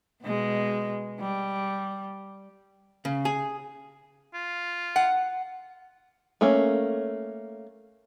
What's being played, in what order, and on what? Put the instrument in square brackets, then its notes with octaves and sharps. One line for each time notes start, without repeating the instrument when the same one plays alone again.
[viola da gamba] B2 G#3
G3
[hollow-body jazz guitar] C#3
G#4
[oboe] F4
[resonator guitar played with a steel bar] F#5
[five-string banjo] A3 A#3 C#4